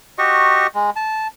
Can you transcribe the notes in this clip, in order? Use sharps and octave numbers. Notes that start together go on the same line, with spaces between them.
F#4 G4 D#5 C#6
G#3
A5